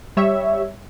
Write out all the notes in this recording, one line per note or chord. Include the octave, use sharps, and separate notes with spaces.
G3 C#5 E5